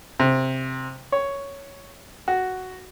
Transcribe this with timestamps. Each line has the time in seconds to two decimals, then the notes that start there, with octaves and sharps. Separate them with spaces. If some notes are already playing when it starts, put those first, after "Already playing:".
0.20 C3
1.12 C#5
2.28 F#4